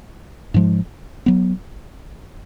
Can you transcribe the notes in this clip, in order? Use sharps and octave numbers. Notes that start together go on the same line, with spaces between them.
G#2 F3 G#3
F#3 B3